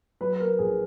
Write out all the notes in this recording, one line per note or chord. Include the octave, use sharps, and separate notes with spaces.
F#3 B4
B4
A#3 A#4
A#1 G#4